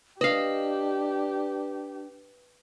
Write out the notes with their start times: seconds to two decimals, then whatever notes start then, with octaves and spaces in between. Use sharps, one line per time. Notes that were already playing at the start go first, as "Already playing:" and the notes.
0.21 D4 G4 B4 D#5 F5